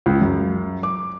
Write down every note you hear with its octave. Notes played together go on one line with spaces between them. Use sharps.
C#2
F#2
D6